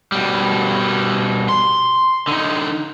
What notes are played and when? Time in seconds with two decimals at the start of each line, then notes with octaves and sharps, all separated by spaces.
0.12 B2 G3
1.49 C6
2.28 D3 D#4